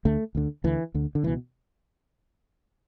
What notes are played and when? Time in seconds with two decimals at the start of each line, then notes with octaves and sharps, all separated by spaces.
0.05 D2 D3 A3
0.35 D2 D3
0.64 D2 D3 E3
0.94 D2 D3
1.15 D3
1.23 C#2 B2 E3